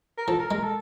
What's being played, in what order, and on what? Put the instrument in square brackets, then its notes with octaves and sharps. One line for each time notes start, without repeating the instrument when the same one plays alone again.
[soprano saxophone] A#4
[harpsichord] F3 [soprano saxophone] A4
[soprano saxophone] A#4
[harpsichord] G#3 [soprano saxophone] A#4
[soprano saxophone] A4